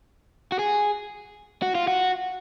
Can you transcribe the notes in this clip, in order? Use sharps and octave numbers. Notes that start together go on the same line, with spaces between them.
F#4
G#4
F#4
F4
F#4